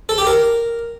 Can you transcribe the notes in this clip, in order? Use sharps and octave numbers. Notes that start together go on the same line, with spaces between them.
A4
G4
A#4